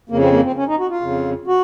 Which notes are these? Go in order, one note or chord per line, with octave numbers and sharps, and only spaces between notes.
F2 C#3 A#3
C4
A#3
C4
C#4
D#4
F#4
F4
F2 C#3
F#4